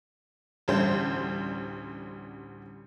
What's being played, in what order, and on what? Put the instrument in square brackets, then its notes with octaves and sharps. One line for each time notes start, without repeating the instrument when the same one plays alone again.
[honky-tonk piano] A1 D2 G3 C5